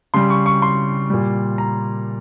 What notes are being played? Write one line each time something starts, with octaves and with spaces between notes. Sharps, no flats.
C#3 G3 C6
C#6
C#6
C6
A#2 G3
A#5